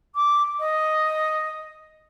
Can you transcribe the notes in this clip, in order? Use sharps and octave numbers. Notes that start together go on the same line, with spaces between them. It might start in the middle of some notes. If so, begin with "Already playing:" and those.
D6
D#5